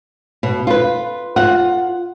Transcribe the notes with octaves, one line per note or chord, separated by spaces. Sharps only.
B2
F4 B4
F4 F#5